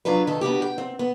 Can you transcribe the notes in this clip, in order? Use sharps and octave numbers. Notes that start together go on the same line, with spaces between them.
F#3 D4 F4 B4
D#3 A4
B3 D4 F#4 G4
G5
C4
B3